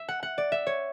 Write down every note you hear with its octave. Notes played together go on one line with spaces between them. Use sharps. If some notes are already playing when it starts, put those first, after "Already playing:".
Already playing: E5
F#5
F#5
D5
E5
C#5